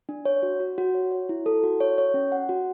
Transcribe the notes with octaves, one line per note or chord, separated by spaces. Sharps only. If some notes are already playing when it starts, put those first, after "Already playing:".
D4
C#5
F#4
F#4
F#4
C#5
C#5
E4
A4
F#4
C#5
C#5
C#4
F#5
F#4